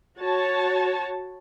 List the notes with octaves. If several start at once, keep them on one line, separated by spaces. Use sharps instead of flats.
F#4 C#5 A5